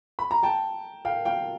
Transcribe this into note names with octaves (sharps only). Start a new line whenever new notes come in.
B5
A#5
G5 A5
F5 G5
F5 G5